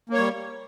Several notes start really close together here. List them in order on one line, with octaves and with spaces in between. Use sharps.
A#3 C#5 G3